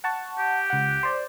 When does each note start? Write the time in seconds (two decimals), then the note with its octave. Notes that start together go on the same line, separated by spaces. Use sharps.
0.04 F#5 A5 C#6
0.39 G4
0.70 C#2 F#5
1.03 C5 D5